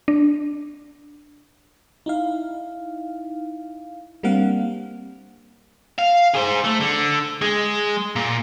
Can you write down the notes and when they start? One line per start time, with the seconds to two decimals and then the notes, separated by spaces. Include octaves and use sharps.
0.08 D4
2.06 D#4 E4 F5
4.23 G3 A#3 C4 D4 F5 F#5
5.99 F5
6.34 G#4 C5
6.64 A3
6.80 D3
7.42 G#3
8.16 A#2